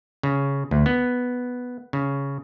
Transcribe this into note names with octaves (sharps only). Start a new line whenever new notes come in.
C#3
D2
B3
C#3